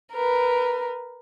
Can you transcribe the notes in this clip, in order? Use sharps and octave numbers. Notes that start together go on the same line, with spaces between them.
A#4 B4